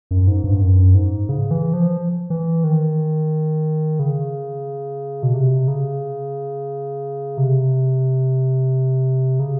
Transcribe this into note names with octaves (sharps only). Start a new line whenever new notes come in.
F#2
G#2
G2
F#2
G#2
C#3
E3
F3
E3
D#3
C#3
B2
C3
C#3
C3
C#3